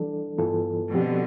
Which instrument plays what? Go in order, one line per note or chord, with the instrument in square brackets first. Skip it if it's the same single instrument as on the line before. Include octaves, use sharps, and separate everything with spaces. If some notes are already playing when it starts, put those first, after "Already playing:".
Already playing: [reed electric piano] E3 G3 D4 A4
G2 E3 B3 F4 A4
[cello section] B2 D3 [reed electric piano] F3 C4 G4